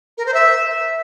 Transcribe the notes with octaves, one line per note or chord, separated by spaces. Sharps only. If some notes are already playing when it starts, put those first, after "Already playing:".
A#4
C5
E5